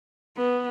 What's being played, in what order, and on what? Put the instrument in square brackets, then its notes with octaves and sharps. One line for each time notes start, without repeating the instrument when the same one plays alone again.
[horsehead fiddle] B3